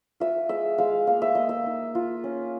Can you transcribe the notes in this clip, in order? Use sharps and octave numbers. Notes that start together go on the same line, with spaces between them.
F4 E5
G#3 E5
G#3 F5
A#3 F5
E5
A#3 D#5
E5
D#4
F4
C#4